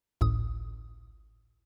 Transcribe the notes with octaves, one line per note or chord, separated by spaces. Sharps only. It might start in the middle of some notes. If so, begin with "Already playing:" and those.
G#1 C#2 A2 D#6